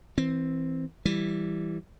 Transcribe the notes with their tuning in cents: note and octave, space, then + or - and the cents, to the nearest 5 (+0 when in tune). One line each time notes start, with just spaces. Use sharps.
E3 -20 C4 +0
E3 +0 G3 +0